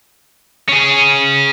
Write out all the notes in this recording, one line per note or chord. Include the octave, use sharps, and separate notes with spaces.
C#4 G#4